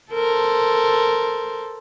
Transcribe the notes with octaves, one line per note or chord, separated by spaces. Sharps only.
A4 A#4 C5